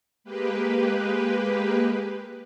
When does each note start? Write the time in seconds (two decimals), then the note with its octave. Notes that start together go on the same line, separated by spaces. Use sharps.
0.24 G#3 A#3 G4 B4